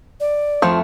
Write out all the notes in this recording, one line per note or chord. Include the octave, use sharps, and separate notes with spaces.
D5
F2 F3 A3